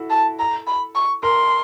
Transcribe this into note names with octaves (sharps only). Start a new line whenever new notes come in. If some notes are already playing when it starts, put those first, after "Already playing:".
Already playing: E4 F#4 A4
A5
A#5
B5
C#6
A#4 C6